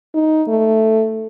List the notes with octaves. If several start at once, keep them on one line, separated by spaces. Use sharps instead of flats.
D#4
A3